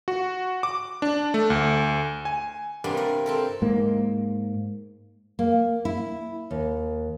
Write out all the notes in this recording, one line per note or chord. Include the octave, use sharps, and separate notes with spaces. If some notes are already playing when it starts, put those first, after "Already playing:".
F#4
D6
D4
A3
D2
G#5
G2 C3 G3 A#3 B3
A#4
C4 A4 A#4
G#2 A#3
A#3
E4
D#2